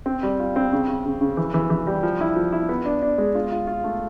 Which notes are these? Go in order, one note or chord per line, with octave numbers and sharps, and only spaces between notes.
C4
G3
F4
C4
C#3
C#3
C#3
C#3
E3
E3
E3
G3
F3
E4
F3
E4
B3
D4
D4
G#3
F4
F4
F4
A3